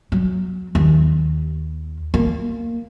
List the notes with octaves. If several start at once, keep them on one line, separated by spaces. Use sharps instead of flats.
F#3
D#2
A#3